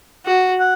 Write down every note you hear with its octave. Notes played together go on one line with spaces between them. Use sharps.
F#4
F#5